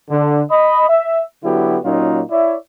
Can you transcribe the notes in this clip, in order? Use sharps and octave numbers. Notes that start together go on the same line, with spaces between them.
D3
D#5 B5
E5
D3 F#3 B3 E4 F#4 G4
A#2 F#3 A#3 C#4 D#4 F4
E4 C#5 D5 E5